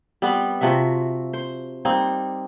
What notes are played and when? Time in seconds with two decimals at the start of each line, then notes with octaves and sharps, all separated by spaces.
0.22 G3 B3 C4
0.61 C3 F3 F#4 E5
1.33 C5
1.85 G3 A#3 C4 D#4